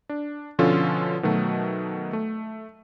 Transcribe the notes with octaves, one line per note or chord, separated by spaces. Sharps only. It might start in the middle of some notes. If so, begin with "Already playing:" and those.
D4
B2 D3 F3 C#4 F4 A4
B2 D#3 F#3 A3
A3